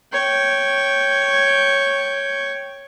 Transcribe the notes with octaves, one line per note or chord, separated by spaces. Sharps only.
C#5 G5